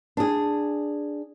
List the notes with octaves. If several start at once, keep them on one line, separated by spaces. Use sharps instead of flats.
D4 G#4